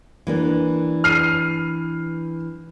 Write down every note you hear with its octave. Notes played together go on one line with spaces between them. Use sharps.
E3 A#3 D4
F6 C7 D#7